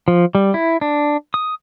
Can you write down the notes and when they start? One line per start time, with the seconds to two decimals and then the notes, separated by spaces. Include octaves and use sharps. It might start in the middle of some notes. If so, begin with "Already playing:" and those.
0.08 F3
0.35 G3
0.54 E4
0.81 D4
1.34 D#6